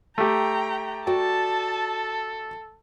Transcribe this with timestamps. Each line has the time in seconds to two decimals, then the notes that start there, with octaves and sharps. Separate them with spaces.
0.18 A3 G4 G5 A#5
1.07 F#4 A4 D5 G5 A5